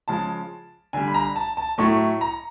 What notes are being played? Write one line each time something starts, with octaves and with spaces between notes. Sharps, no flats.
C#3 F3 G#3 A5
D3 G3 G#5
B5
A#5
A5
A5
A2 F#3 A3 C#6
A#5